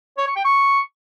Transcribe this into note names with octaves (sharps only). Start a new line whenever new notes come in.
C#5
C#6
G5
C#6